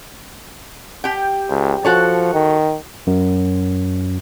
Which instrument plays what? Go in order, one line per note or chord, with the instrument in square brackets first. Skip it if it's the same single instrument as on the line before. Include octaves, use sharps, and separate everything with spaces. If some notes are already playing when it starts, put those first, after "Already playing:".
[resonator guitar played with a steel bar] G4 G5
[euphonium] C#2
[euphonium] F3 [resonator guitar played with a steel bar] F#4 A4 C#5
[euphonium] D#3
[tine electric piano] F#2